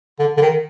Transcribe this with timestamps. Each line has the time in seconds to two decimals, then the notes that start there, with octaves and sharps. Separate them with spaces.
0.19 D3
0.37 D3
0.42 D#3